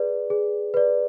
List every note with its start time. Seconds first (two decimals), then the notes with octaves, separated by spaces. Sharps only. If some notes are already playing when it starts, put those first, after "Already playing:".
Already playing: G#4 B4 D5
0.30 G#4
0.74 B4 D5